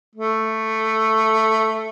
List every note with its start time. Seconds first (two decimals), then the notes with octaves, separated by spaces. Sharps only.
0.16 A3